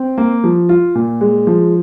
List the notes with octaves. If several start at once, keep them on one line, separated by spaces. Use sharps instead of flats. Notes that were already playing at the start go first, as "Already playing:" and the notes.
Already playing: C4
A#3
F3
F4
A#2
G#3
F3